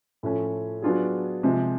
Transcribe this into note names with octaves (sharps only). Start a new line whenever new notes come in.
A2 F3 A3 C#4
F#3 B3 D4 F4 G#4
C3 F3 G#3 C4